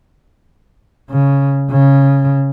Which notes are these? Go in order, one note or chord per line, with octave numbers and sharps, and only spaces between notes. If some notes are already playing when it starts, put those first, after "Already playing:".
C#3
C#3